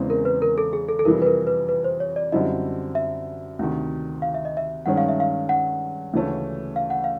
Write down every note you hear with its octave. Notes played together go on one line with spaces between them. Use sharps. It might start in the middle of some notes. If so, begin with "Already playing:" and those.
Already playing: E2 C#3 E3 G#3 C4
A#4
B4
A#4
A4
G#4
A4
A4
F2 C3 E3 G3 A#4
B4
A#4
B4
B4
C5
C#5
D5
F#2 D3 G3 C4 E4 D#5
E5
D2 C3 D#3
F5
E5
D#5
E5
G2 D#3 G#3 C#4 F#5
F5
E5
F5
F#5
D2 C#3 E3 A3 C#4
F5
F#5
F5